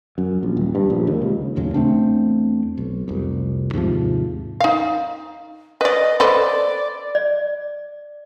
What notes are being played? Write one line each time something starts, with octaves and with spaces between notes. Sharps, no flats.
F#2
A#1
D#1
G2
A#1
D#2
C#2
A1 D#2 C#3 F#3
E2 A3 C4 D4
B1
F1 C2
D#2 G#2 C3 F3
D#4 F5
B4 D5 D#5
A4 B4 C5 D5
D5